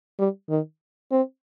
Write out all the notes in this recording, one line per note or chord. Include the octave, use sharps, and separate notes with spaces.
G3
D#3
C4